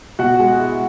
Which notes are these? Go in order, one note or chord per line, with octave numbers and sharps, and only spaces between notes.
B2 F#4 F#5
G#3
E4